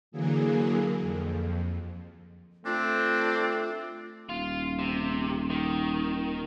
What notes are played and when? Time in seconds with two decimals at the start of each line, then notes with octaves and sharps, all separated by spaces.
0.12 D3 E3 F#3 A#3 G#4
1.01 F2
2.66 A3 C4 D4 F4
4.29 D#1 F4
4.79 C3
5.50 D#3